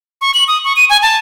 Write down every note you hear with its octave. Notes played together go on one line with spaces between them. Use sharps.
C#6
F#7
D#6
C#6
D#7
G#5
A5